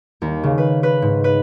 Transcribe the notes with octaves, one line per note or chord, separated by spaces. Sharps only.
D#2
C#3
B4
B4
G#2
B4